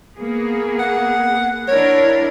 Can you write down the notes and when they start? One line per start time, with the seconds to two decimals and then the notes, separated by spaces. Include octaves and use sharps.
0.16 A#3 B3 G#4
0.79 F#5
1.68 D4 E4 A#4 C#5